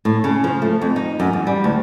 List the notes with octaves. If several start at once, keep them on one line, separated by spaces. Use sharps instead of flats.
A2
C#3
F3
A3
F2
D#4
F#2
E2
G3
D2